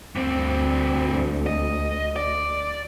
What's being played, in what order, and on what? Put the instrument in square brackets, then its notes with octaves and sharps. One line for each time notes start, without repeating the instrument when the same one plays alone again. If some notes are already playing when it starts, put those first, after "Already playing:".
[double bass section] D2 [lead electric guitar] G2 C4
[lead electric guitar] D#5
D5